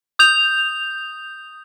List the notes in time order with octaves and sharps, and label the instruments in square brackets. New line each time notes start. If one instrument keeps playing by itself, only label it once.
[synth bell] D#6 G6 F7